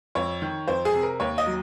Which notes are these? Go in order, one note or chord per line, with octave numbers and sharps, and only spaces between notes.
F2 C#5
D#3
F2 C5
G#4
C3
A#4
D#2 C#5
D#5
F#3